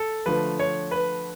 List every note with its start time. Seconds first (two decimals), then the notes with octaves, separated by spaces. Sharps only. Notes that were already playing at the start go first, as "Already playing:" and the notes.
Already playing: A4
0.26 D3 F3 A3 B4
0.60 C#5
0.91 B4